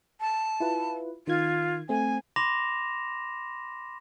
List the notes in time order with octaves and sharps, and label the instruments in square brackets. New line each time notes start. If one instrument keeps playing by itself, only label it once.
[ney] A5
[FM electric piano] E4 F4 B4
[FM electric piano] D#3 G#6 [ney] F4
[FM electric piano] A3 C4 [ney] G#5
[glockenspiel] B5 C6 D6 A#6 E7 F7